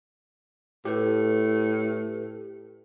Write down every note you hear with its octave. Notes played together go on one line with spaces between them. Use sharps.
A2 G4 A4 B4